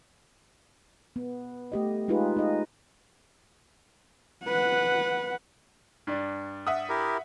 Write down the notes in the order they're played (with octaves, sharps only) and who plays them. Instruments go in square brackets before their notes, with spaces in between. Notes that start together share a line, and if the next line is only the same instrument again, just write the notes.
[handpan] B3
A3 G4 D#5
G#3 D#4 F4 G4 G#4 B4
D#4 D#5
[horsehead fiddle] B4 F#5
[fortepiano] G2 D4
[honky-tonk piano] E5 F#5 D#6
[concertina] E4 G4 A#4